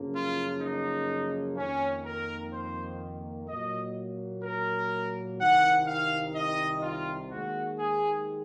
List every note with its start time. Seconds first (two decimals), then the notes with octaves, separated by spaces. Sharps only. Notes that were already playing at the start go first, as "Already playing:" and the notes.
Already playing: F#2 C#3 F3 A#3
0.13 F4
0.61 D#4
1.56 F2 D#3 A#3 C#4
2.05 A#4
2.53 C5
3.48 A#2 F#3 A#3 D#5
4.44 A#4
5.39 C2 C3 D#3 F#5
5.87 F5
6.35 D#5
6.83 F4
7.31 D#2 D#3 G#3 F#4
7.78 G#4